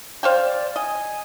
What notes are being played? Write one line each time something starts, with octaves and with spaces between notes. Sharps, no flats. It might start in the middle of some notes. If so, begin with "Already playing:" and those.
C5 D5 F5 G5
D5
D#5 G#5